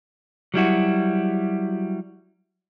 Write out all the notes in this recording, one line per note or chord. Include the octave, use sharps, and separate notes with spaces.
F#3 G3 E4 F#4